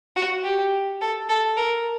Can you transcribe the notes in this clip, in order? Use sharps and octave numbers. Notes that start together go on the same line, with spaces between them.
F#4
G4
A4
A4
A#4